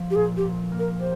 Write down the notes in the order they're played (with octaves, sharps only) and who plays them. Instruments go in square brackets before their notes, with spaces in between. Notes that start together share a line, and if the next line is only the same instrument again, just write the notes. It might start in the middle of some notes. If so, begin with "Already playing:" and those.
Already playing: [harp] F3
[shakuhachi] G4
[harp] A#2 [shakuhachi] G#4
[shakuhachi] G4
[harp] A#2
A#3
[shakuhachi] A#4
[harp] G4 [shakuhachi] C5